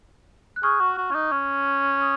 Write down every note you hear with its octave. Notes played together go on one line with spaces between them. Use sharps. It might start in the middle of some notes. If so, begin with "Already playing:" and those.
F#6
G#4 C#6 F6
F#4
F#4
C#4
D#4
C#4
D#6